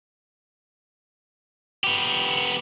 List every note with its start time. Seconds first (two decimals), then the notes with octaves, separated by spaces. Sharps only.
1.84 B3 G4